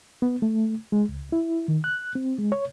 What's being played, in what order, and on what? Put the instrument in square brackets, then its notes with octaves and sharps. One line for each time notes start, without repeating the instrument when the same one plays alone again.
[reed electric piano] B3
A3
G#3
C#2
E4
D#3
F#6
C4
G#3
C#5